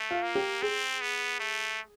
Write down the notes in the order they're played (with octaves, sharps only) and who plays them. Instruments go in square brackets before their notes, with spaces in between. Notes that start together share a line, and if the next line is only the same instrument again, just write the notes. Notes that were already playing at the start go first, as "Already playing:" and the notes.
Already playing: [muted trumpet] A3
[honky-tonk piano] F4
[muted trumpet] A#3
[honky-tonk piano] G4
[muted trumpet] C4 [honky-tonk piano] G#4
[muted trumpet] B3
A3